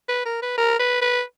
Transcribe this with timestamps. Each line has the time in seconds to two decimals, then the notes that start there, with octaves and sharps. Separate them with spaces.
0.09 B4
0.26 A#4
0.42 B4
0.58 A#4
0.79 B4
1.02 B4